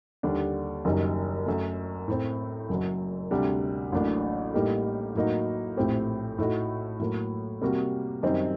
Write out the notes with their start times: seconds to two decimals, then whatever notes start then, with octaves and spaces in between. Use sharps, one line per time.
0.23 D#2 D3 G3 D4
0.85 F#1 F#2 D#3 G3
1.46 F#2 F#3 A3
2.08 A2 A3 C4
2.69 F#1 F#2 F#3
3.31 D2 C3 G3 D4
3.92 A1 A2 F#3 A#3 D4
4.54 A2 G3 A#3 D#4 G4
5.15 A2 F#3 A#3 D#4 F#4
5.77 A#1 A2 A3 C4 G4
6.38 A2 A3 D#4 F#4
7.00 A2 F#3 A#3
7.61 C3 G3 A#3 F#4
8.23 F#2 D#3 G3 C4 D#4